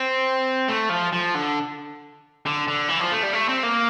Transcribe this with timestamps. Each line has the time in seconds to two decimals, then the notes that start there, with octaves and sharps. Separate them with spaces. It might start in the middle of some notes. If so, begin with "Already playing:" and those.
Already playing: C4
0.68 A3
0.89 F3
1.12 F3
1.34 D3
2.46 D3
2.68 D3
2.89 E3
3.00 F3
3.12 A3
3.23 G3
3.34 A3
3.49 C4
3.63 A#3